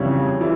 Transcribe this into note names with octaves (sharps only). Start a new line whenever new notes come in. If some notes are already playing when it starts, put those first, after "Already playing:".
Already playing: F2 C#3 E3 G3 C#5
E3 G3